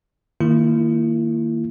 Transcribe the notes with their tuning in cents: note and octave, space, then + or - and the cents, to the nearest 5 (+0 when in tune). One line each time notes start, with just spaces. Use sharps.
D#3 +0 A#3 -20 E4 +40